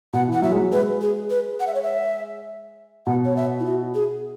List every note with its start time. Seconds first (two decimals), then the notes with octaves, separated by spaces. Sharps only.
0.13 B2 F#5
0.28 E3
0.33 F#5
0.42 F#3 E5
0.52 G#3
0.57 F#3
0.71 G#3 B4
1.01 G#4
1.30 B4
1.60 F#5
1.67 E5
1.74 C#5
1.82 E5
3.06 B2 F#5
3.25 C#5
3.36 E5
3.60 E4
3.65 F#4
3.95 G#4